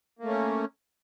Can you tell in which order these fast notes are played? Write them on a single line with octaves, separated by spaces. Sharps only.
A#3 A3 C#4